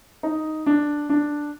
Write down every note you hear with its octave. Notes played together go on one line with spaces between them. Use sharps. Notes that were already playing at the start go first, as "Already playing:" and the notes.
D#4
D4
D4